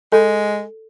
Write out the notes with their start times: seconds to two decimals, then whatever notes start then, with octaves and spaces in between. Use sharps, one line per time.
0.12 G#3 A4